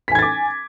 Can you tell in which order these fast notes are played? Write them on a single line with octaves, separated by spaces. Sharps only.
B6 G#5 G#6 A6 D6